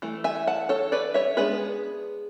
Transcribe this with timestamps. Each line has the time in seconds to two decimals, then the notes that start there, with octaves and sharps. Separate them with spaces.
0.02 E3 A3
0.24 E5 G#5
0.47 F#5 A5
0.69 A4 C#5
0.92 B4 D5
1.14 C#5 E5
1.37 G#3 B3 D4 G#4 B4